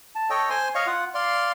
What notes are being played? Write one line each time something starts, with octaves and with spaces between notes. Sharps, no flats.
A5
A4 C#5 D#5 G5
C5 G#5 C6
C#5 D#5 F5 C#6
F4 F#5
D5 F5 C6